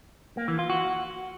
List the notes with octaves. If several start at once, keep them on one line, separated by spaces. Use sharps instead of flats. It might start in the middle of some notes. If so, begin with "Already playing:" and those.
A#3
E3
F4
F#4